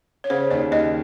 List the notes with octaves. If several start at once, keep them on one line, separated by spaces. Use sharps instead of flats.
C#5
C#3 C5
D#2 D5
D#2 D#5